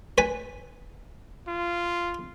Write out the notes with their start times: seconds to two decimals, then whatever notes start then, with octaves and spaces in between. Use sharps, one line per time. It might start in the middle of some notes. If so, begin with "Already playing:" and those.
0.18 B4 G#5
1.48 F4